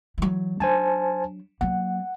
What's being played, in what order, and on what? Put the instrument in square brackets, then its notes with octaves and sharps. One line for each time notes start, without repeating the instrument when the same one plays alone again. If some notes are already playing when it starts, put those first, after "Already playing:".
[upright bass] E3 F#3
[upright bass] F#3 D4 [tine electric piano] C5 G#5 A5
[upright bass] F#3 A#3 [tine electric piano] F#5